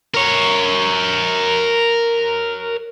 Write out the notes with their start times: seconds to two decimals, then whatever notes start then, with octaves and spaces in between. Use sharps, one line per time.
0.14 A#4 C#5